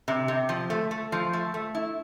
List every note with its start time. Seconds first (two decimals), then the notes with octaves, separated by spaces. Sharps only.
0.08 C3
0.28 C3
0.49 F3
0.70 A3
0.91 A3
1.12 F3
1.33 A3
1.54 A3
1.75 E4